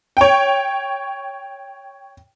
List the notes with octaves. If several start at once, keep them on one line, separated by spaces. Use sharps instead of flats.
C#5 G5